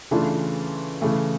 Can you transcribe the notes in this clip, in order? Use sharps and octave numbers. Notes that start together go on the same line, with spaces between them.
C#3 E3 A3 D4 F4
C#3 E3 A3